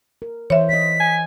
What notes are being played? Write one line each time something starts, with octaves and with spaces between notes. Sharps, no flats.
A#4
E3 C5 C#5 E5
E3 D#5 B6
G#5